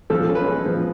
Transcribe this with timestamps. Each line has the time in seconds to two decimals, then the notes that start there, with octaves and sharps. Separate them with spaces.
0.10 F3 A4
0.29 C#4
0.35 B4
0.47 G#3
0.66 F3